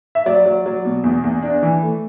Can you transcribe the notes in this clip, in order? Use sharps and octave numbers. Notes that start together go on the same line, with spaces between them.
E5
F#3 D5
F#3
F#3
B2
E2
E2
D4
E3
A3